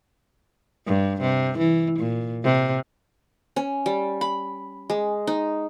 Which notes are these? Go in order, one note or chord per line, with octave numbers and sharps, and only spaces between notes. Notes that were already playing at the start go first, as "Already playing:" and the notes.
G2
C3
E3
A#2
C3
C#4
G3
B5
G#3
D#4